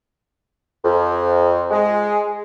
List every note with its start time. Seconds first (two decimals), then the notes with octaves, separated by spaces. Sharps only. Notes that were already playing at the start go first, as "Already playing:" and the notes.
0.84 F2
1.71 G#3